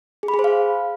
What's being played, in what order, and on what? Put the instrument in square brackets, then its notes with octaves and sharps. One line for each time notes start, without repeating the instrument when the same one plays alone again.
[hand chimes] G#4
B5
G#4
C5
F5